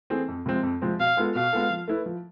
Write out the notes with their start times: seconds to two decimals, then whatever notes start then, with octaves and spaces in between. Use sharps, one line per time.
0.10 E3 A3 C4 G#4
0.28 F2
0.46 C3 F3 G#3 C4
0.63 F2
0.82 C3 F3 G#3 C4
0.99 B2 F5
1.17 G#3 B3 F4 A4
1.35 B2 F5
1.53 G#3 B3 F4 A4
1.71 F3
1.88 A3 E4 B4
2.06 F3